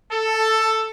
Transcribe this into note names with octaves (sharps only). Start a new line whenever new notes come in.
A4